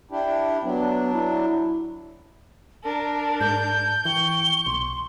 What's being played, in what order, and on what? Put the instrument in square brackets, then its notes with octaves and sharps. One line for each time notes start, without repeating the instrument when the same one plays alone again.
[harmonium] D4 E4 G4
[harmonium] F#3 D4 [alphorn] B3
[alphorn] E4
[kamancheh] D4 A#4 [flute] A5
[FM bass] G#2 [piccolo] G6
[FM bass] E3 [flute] G5 [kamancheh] C#6 [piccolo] G7
[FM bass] B1 [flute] C6